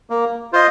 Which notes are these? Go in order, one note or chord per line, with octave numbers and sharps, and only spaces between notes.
A#3
F4 C5 D#5